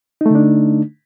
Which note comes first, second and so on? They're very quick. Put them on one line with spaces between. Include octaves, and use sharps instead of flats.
D#4 A3 D3 D4